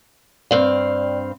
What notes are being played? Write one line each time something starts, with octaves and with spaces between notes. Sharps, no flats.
G2 C4 D5 F5